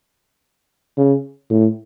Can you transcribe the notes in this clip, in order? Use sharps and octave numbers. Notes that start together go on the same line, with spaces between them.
C#3
A2